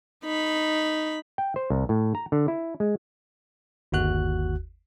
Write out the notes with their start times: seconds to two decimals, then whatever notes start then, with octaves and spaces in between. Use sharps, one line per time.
0.24 D#4 B5
1.38 G5
1.56 C5
1.70 C2
1.89 A2
2.15 A#5
2.32 D3
2.48 E4
2.80 G#3
3.92 G1 D#2 F#4 F#6